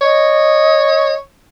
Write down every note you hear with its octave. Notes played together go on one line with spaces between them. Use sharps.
C#5 D#5